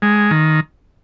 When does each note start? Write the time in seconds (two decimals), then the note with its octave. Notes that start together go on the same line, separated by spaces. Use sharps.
0.02 G#3
0.31 D#3